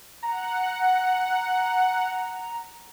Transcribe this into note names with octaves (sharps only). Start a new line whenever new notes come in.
F#5 A#5